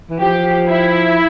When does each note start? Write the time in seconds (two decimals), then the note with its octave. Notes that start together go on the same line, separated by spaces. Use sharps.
0.10 E3
0.20 F3 G4
0.68 E4